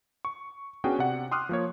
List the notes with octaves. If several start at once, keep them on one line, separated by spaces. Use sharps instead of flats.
C#6
B3 C#4 D4 F#4 G#4 G5
C3 D5 F#5
G5 C6 D6 D#6 F6 F#6
F3 A#3 C#5